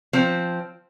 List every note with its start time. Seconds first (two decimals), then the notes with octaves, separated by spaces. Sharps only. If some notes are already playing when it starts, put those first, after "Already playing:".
0.13 F3 C4